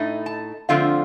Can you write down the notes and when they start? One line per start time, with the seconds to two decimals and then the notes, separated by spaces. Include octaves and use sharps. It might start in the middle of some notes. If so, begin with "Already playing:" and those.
Already playing: A2 A3 D#4
0.26 A5
0.69 D3 F3 A3 C4 F4 F5